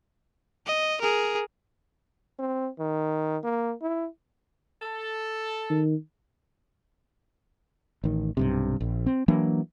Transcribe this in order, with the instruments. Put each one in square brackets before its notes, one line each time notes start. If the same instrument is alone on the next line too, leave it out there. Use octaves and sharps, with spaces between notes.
[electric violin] D#5
G#4 A#4
[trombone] C4
D#3
A#3
E4
[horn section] A4
[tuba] D#3
[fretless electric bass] A1 D#3
B1 G2 C3
A#1
C4
E3 F#3 A#3 D4